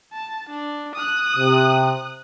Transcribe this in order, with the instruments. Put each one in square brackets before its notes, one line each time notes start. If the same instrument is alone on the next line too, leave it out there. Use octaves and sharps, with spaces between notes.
[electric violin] A5
D4
D#6 F#6
[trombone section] C3